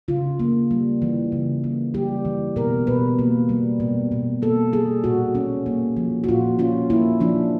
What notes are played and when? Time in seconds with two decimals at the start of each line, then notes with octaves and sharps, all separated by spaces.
0.08 C#3 F4
0.40 A#3
0.71 G3
1.02 E3
1.32 C#3
1.64 A#3
1.94 G3 G4
2.25 E3
2.56 B2 A#4
2.87 B2 B4
3.19 A#3
3.49 G3
3.80 B2
4.12 B2
4.42 A#3 A4
4.73 G3 G#4
5.04 A#2 F#4
5.35 C#4
5.66 A#3
5.97 F3
6.24 F#4
6.28 A#2 F4
6.59 C#4 F4
6.90 A#3 E4
7.20 F3 D4